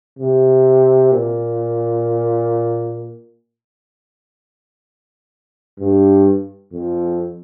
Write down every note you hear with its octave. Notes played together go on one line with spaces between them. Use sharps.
C3
A#2
G2
F2